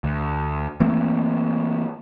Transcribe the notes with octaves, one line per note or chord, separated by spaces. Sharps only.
D2
E3 A3 A#3 C4